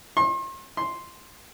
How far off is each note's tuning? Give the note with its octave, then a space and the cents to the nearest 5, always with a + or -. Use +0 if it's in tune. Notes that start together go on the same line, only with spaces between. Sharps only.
C6 +40
C6 +0